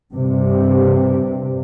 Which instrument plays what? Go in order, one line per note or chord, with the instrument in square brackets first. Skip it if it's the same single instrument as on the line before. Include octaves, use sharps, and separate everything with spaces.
[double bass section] G2 C3